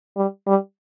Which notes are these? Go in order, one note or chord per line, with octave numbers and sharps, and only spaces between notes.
G3
G3